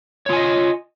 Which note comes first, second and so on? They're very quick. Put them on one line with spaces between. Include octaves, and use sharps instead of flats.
C#5 F4 G#5 D#5